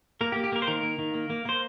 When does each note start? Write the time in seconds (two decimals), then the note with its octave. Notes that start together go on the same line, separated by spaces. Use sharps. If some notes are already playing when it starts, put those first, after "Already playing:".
0.21 A#3 A#4
0.32 G4
0.36 A#3
0.44 G4
0.52 A#3 A#4
0.62 C5
0.67 D#3 A#4
0.83 A#3
0.98 D#3
1.14 A#3
1.30 A#3
1.45 A#3 C5